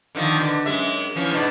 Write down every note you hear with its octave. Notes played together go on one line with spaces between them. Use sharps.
D3 D#3 F3
B2 D3
F#2 G#3 E5
E3 F3 C#4
G#2 B2 D4